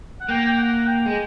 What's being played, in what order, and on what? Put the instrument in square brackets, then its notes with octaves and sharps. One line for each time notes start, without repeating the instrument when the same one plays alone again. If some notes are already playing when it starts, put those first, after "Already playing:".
[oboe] F#5
[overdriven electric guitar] A#3 [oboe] G5
[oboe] G5
F#5
G5
[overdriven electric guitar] G#3